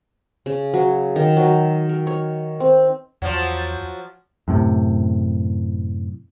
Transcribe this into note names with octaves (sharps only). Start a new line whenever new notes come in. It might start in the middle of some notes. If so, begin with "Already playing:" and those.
C#3
F#3
D#3
F#3
A#4
C#5
C4
E2 F3 F#3
F#2 A2 C3